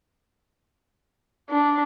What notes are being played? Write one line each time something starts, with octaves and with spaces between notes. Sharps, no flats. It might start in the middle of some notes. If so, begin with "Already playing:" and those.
D4